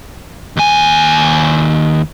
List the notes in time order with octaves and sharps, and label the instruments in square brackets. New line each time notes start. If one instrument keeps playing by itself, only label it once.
[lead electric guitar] D#2 G#5